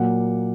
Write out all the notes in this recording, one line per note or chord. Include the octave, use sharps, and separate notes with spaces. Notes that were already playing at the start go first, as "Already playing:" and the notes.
Already playing: A#2 F#3 A#3 F#5